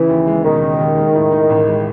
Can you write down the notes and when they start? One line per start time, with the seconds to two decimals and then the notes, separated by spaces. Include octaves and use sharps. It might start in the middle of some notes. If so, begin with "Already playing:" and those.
Already playing: C#3 E3
0.09 D#2
0.27 G#3
0.44 E1 D#3
0.62 C#3
0.80 D#2
0.97 G#3
1.15 A2
1.32 D#4
1.50 A1
1.67 G#3